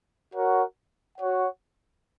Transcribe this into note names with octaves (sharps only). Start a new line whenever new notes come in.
F#4 A#4 C#5 F#5
F#4 C#5 F#5